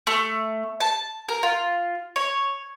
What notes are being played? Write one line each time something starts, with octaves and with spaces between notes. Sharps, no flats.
A3
A5
A#4
F4
C#5